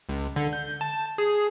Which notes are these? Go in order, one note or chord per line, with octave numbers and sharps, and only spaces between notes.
C#2
D3
G6
A5
G#4